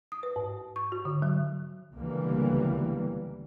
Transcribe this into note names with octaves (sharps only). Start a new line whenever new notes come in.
D#6
B4
G#2
C#6
F#4
D3
F#3
C#2 B2 D3 E3 G3 A#3